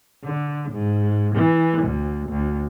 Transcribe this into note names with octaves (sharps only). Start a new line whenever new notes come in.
D3
G#2
E3
D2
D2